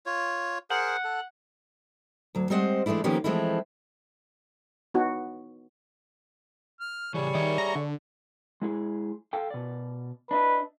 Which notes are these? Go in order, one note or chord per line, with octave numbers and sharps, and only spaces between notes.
F4 C#5
G#4 A#4 C5 F#5
A4
D2 F#3
G3 G#3 C4 C5 D#5 F#5
E3 G#3 A3 D4 E4
D#3 F3 A#3 B3 C#4 G4
E3 F3 G#3 A3 C4 E4
B3 D#4 F#4
F6
C#3 E3 G3 G#4 C#5 C#6
D#3 D5 E5
A#5
D3
G#3 E4 G#4
A4 F5 G5
B2 D5
D4 B4 D#5 E5